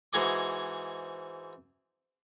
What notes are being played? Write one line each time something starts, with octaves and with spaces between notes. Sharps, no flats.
G#2 E3 F#4 G#4 D#5 D6